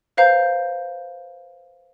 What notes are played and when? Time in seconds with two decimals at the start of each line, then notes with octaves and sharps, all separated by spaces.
0.17 B4 C5 F5 A#5 G6